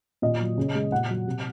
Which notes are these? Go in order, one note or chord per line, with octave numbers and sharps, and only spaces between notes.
A#2 D#5
F#3
C#3
G#3
A#2 F#5
F#3
C3